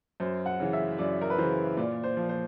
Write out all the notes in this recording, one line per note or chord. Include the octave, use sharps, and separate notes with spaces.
F#2 C5
F#5
C#3 E3
E5
F#2 D5
A#4
B4
C#3 E3 C5
A#2 D5
C5
F3
C5